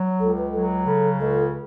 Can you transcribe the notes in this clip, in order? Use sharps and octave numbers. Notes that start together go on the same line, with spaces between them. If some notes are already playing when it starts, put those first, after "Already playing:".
Already playing: F#3
C#2 A4
B4
F#3 A4
C#3 A4
C#2 A4